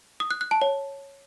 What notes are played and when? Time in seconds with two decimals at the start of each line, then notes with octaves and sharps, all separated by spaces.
0.20 D#6
0.31 F#6
0.41 F#6
0.51 A5
0.62 C#5